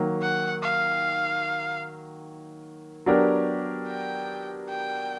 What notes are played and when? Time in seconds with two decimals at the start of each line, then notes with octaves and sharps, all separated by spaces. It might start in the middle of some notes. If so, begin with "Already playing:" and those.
Already playing: D#3 F#3 A#3
0.22 F#5
0.63 F5
3.06 F#3 B3 D4 G4 A#4
3.88 G5
4.69 G5